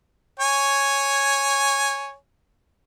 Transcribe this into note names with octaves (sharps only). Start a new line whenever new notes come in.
C#5 G#5